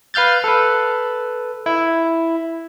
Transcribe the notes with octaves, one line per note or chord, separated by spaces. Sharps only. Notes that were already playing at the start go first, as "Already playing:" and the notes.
B4 F5 F6 G6 A6
A4 B4
E4